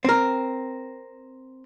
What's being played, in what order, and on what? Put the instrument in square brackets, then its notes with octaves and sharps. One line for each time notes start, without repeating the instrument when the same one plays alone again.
[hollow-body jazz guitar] C4 A#4